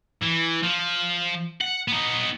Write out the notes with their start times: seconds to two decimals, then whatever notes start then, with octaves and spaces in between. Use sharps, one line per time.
0.23 E3
0.63 F3
1.61 F#5
1.88 B3 D#4